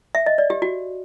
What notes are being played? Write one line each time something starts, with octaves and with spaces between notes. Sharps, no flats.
E5
D#5
D5
G4
F#4